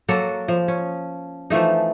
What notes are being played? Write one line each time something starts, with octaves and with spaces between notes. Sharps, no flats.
F#3 A#3 F#4 A4
F3
C#4
E3 F3 A3 D#4